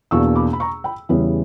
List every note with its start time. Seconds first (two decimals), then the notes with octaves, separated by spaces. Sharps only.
0.11 E2 B2 A#3 D4 C#6 E6
0.35 B5 D6
0.53 B5
0.60 A#5 C#6
0.84 G5 B5
1.09 E2 C#3 E3 G3 B3